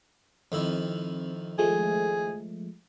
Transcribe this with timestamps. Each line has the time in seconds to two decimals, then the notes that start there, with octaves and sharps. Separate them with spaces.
0.52 F2 D#3 C4 E4
1.58 F3 G#3 A3 G#4